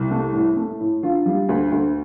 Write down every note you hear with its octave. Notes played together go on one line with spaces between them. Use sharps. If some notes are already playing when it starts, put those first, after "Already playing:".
Already playing: C2
A3
A2
A3
A2
D3 F4
G3
D2
D2